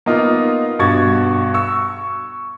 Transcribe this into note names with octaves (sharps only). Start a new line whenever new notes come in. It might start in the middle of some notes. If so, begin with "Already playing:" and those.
A#3 B3 D#4 F4
G2 B2 F#4 C#6 G#6 A6
C#6 E6